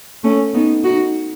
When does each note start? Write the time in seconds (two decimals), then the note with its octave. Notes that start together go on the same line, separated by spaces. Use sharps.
0.23 A3 C#4
0.54 B3 D#4
0.84 D#4 F#4